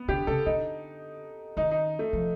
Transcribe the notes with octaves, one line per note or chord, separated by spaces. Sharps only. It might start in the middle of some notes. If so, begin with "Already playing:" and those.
Already playing: B3
D3 G4
C#3 A4
D3 D#4
D#3 D#4
D#4
A3
F3